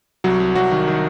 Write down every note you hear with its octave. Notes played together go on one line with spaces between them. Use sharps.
C2 F#3 F#4
C2
C2 F#3 F#4
D#3
D#3